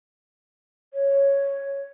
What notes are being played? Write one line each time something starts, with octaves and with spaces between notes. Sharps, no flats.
C#5